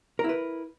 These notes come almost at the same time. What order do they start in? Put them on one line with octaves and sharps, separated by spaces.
A#4 E4 B4